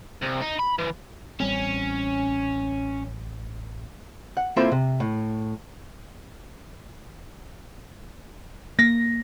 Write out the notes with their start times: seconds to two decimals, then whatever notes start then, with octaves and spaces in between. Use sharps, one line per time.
0.22 C2
0.42 D#4
0.60 B5
0.79 E3
1.40 A1 G3 C4 C#4
4.37 F#5
4.57 A#3 C4 E4 F4 A4 C5
4.72 C3
5.00 A2
8.79 A#3 A#6